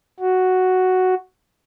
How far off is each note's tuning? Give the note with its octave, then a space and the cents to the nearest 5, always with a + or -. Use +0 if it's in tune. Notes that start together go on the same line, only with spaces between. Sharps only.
F#4 +0